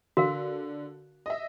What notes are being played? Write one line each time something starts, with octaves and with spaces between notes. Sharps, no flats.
D3 F#4 A#4 F5
D#5 E5